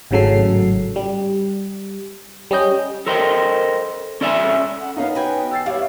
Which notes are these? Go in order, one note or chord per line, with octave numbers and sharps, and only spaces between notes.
G#1 A2 C#3 F#3 A4 C7
G3
G3 C#4 D#5 G6
A4 A#4 C5 D#5 G5
C#4 A4 D5 E5 F5 G#5
F#5
B3 C#4 D#4 F5
F#4 B4 G5 G#5
E6 A6 C7
G3 B3 E4 C#5 F5